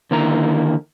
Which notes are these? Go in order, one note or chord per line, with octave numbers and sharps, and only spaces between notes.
D3 D#3 A#3 E4 A#5